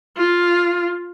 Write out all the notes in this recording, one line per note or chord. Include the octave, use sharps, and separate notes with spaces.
F4